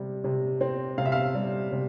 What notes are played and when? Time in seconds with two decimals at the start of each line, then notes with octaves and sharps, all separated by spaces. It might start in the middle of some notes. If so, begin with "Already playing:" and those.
Already playing: C3 G3
0.24 C3
0.61 C4
0.98 C3 F5
1.05 E5
1.12 F5
1.35 G3
1.72 C3